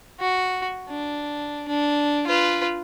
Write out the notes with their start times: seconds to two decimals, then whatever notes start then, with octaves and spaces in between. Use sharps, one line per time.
0.20 F#4
0.89 D4
1.68 D4
2.27 F4 B4